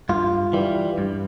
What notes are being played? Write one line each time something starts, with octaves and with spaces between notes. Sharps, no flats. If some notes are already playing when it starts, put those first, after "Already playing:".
G2 F4
E3 G3
G2